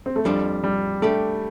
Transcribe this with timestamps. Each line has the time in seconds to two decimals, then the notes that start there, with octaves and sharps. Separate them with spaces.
0.06 C4
0.16 A3
0.25 F2 F3 G3 D4 A4
0.64 G3
1.02 G3 A3 D4 G4 D5